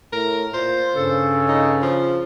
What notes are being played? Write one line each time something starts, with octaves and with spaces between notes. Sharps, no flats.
A2 A#4
A#2 F4 C5
G2 C#3 A4
D#4
F3